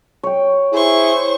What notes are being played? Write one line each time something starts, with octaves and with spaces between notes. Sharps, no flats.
C#5 G5
E4 G#4 C5 C#6